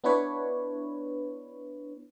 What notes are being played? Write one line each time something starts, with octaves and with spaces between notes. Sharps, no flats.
B3 D4 E4 B4 C#5